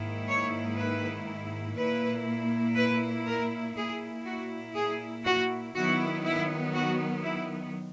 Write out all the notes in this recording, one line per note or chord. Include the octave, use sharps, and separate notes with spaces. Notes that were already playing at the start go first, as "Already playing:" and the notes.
Already playing: G#2 D#3 A#3 E4
C#5
B4
A#2 A#3 E4 B4
B4
A#4
A#2 A#3 E4 G#4
F#4
G#4
F#4
D#3 F#3 B3 E4 F#4
E4
F#4
E4